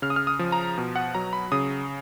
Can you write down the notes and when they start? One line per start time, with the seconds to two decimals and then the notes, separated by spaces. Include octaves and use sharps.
0.02 C#3 F6
0.10 D#6
0.16 F6
0.27 D#6
0.39 F3
0.52 A#5
0.78 B2
0.96 F#5
1.15 F#3 A#5
1.33 B5
1.52 C#3 D#6